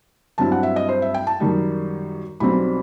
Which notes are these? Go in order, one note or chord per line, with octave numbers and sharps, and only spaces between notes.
G2 F#3 C4 E4 A5
F#5
E5
D#5
C5
E5
G5
A5
F#2 D#3 G3 D#4
B1 B2 G3 C4 B5